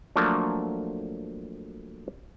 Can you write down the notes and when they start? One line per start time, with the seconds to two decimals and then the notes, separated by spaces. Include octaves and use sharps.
0.16 F3 F#3 A3 A#3 D4